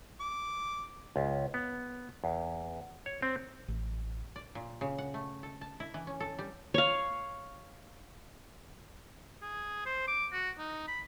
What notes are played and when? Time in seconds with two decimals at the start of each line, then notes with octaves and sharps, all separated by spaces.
0.20 D6
1.16 C#2
1.54 B3
2.24 E2
3.06 C#5
3.22 C4
3.68 A1
4.36 D5
4.55 A#2
4.81 C#3
4.98 F#5
5.14 A3
5.43 A4
5.61 A5
5.80 E4
5.94 E3
6.07 C#4
6.20 A4
6.39 G3
6.74 C#5 F5
9.42 G#4
9.86 C5
10.08 D6
10.32 F#4
10.58 D#4
10.88 B5